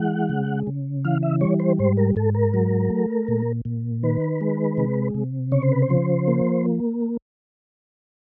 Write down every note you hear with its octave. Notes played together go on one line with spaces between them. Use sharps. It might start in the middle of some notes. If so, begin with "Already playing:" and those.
Already playing: E3 G#3 F#5
C#3
C#3
E3 F5
E5
G3 C#5
C5
G#2 C5
A#4
G#2 A4
A#4
F#3
A3
A#2
A#2
D#3 B4
G#3
C3
C3
C#3 C#5
C5
B4
C5
F3
A#3